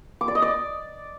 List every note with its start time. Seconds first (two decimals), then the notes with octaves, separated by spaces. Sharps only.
0.21 D6
0.28 D5
0.35 D#5
0.42 D5